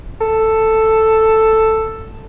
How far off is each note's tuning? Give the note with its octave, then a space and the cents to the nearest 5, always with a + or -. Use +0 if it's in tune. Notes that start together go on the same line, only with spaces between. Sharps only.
A4 +5